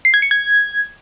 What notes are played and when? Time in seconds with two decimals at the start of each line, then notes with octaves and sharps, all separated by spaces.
0.05 C7
0.14 G#6
0.22 C#7
0.31 G#6